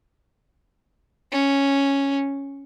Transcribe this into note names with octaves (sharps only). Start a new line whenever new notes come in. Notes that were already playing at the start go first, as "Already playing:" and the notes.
C#4